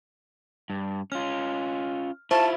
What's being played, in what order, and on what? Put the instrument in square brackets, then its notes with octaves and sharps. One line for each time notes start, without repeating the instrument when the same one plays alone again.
[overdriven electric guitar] G2
[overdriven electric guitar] C#4 F4 [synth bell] F6
[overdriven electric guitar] E4 F4 [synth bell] C5 E5 C#6 [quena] A5